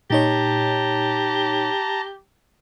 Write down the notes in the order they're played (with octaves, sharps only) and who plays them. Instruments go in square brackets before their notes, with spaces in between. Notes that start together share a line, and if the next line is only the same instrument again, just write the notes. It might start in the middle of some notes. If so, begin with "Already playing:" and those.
[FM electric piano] A#2 D#4 C#5 [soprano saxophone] G4 [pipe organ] A5 A#5